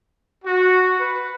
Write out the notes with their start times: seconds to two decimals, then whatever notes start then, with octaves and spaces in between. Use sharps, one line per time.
0.45 F#4
0.99 B4